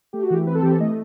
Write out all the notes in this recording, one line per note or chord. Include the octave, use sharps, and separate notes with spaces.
A3 G4
F#4
E3 G4
C4 B4
A4
E3 G4
A4
A3 D#5